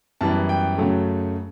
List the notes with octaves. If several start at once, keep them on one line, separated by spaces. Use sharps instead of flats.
F#2 E3 G3 B3 A5
G5
F#2 C#3 F#3 A3